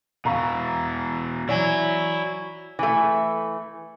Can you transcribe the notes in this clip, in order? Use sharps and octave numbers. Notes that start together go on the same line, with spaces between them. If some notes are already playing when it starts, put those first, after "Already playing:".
B2 E3 F5 A#5 C#6
E3 F#3 E4 D5 G#5
E3 A3